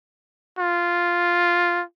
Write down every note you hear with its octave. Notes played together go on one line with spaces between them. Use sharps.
F4